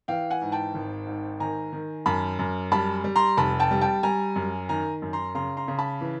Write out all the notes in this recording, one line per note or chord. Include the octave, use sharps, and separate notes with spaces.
E3 F5 G5
F#5 G#5
G#2
G5 A5
G#1
G#2
D#3 G#5 A#5
D#3
F#2 A5 B5
F#2
G3 A5 B5
G3
A#5 C6
F1 A5 B5
G5 A5
G3
G5 A5
G3 G#5 A#5
F#2
D#3 G#5 A#5
F#2
A#5 C6
C#3 A#5 C6
A#5 C6
C#3
A5 B5
E3